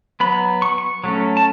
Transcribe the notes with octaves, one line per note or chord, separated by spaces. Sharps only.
F#3 B3 B5
C#6
C#6
F#3 A3 C#4
A5